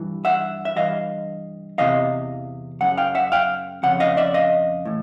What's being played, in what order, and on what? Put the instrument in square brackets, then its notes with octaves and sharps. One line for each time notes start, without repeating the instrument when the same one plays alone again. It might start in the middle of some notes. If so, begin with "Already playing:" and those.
Already playing: [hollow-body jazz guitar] G2 E3
E5 F#5
E5
G2 E3 D#5 F5
E2 C3 E3 D#5 F5
F#2 C#3 F#5
F5 G5
E5 F#5
F5 G5
F2 C#3 F#5
D#5 F5
D5 E5
D#5 F5
A2 E3